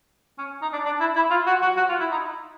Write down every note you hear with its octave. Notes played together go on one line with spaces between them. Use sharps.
C#4
D#4
D4
D4
E4
E4
F4
F#4
F#4
F#4
F4
E4
D#4